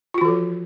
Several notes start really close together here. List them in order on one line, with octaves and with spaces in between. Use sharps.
F4 F#4 E3 A4 F3